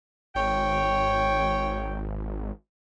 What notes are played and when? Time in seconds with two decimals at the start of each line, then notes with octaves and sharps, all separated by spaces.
0.35 G#1 C#5 G5